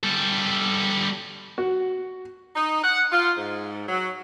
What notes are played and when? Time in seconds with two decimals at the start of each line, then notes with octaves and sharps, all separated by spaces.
0.03 G3 A4
1.58 F#4
2.56 D#4
2.82 F#5
3.12 F4
3.37 G#2
3.88 F#3